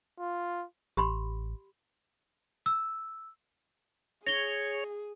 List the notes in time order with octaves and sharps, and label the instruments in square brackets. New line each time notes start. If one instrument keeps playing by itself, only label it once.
[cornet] F4
[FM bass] A1 [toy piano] G4 B5 C6
[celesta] E6
[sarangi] G#4 [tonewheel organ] C#5 [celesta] A#6 G7